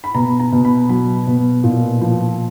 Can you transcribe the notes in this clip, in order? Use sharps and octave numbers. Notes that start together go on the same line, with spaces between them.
B5
B2 A#5
A#5
B2
B5
F#3 B5
B2
A#2
F3